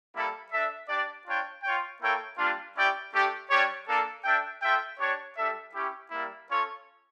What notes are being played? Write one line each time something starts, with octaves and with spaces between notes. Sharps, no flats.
G3 A#3 E4 A4
D4 A4 E5
D4 G4 D5
D4 F4 C#5 G5
F4 C#5 G5
A#3 E4 A4 C#5 G5
G3 A#3 D4 F4
C#4 E4 G4 D5 G5
A3 D4 G4
G3 D4 G4 C#5
A#3 D4 A4
D4 A4 E5 G5
F4 A4 E5 G5
D4 G4 C#5
G3 D4 A4 E5
C#4 E4 G4
G3 A#3 E4
C#4 F4 A4 C#5